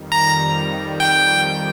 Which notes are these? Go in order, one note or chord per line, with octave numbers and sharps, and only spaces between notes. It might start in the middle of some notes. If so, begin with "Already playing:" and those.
Already playing: F2 D#3 G3
A#5
G5